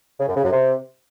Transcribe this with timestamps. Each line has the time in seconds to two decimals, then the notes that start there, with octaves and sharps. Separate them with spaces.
0.20 C#3
0.28 F#2
0.36 C#3
0.44 F#2
0.52 C3